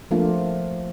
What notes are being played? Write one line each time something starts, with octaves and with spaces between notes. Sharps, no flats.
F3 A3 A#3 D4 F4